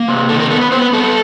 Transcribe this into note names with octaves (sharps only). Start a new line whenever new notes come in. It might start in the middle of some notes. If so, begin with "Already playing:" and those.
Already playing: A#3
C3
D#3 A4
A#4
B3 A4
B4
B3 C5
B4
B3 A4
A4